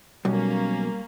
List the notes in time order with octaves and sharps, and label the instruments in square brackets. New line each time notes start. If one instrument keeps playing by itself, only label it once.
[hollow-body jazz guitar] B1 [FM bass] G3 [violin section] A#3 C#4